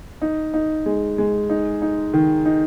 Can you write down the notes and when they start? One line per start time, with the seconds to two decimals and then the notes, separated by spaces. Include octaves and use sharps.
0.22 D#4
0.54 D#4
0.86 G#3
1.18 G#3
1.50 D#4
1.82 D#4
2.13 D#3
2.45 D#4